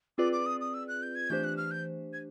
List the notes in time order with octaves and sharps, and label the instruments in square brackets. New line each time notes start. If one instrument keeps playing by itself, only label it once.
[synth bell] C4 F4 G#4 B4 D5 [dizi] D6
[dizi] D6
D#6
D#6
E6
F#6
G6
G#6
[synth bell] E3 A3 D4 G4 C5 [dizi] G6
[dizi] F#6
F6
G6
G#6